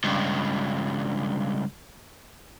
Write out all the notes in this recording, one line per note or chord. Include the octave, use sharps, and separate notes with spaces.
C#2 G2